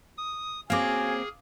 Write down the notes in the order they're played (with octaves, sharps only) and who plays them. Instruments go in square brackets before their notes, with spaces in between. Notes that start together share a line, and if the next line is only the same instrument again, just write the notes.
[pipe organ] D#6
[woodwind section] C#3 F#4 G#5 [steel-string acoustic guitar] A#3 C4 [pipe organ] G#4 [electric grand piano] F5 D6